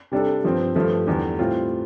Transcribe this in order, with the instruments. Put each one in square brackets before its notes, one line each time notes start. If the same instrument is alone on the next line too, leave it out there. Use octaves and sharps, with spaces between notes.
[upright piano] C3 G3 D4 A4
G2 F3 C4
G2 F3 A3
E2 D3 G3
A2 G3 C4 F4